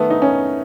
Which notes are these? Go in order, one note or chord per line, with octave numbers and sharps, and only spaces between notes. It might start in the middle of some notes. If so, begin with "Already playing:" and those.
Already playing: D#3 A3 B3
D#4
C#4